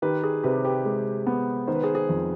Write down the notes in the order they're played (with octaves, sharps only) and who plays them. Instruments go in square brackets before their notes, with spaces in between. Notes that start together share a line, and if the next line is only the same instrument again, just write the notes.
[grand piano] D#3 G4 B4
G#4
C3 G4 B4
G4 B4
G#3
B3
D#3 C5
B4
G#4 C5
G#4 C5
F2